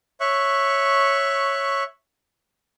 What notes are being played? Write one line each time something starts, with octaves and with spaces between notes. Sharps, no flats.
C#5 E5 C#6 F#6